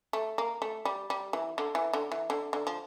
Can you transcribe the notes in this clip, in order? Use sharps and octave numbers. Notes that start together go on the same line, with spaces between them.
A3
A#3
A3
G3
G3
E3
D3
E3
D3
E3
D3
D3
F3